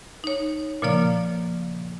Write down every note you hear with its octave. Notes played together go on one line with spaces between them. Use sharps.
D#4 C#5
A#2 C#3 F3 A#3 D5 F5